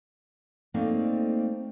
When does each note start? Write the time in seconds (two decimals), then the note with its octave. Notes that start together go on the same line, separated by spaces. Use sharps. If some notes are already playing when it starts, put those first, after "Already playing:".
0.74 A3 A#3 C4 D#4 D5 F5